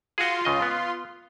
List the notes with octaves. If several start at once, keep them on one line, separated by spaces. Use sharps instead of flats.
F4 F#4 G#4 C6
C#2 C#3 D#5
B3